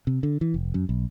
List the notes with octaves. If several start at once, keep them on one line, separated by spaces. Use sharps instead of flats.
C3
D3
E3
F1
F#2
B1